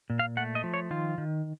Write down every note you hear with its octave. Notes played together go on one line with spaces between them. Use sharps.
A#2
F5
A3 F#5
D#5
F3
C#5
D#3 F4
D#3